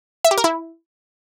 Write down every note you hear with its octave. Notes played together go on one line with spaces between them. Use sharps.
E5
G4
A#4
E4